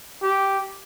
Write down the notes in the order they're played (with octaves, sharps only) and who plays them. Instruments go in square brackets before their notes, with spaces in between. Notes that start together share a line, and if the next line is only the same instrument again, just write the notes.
[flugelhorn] G4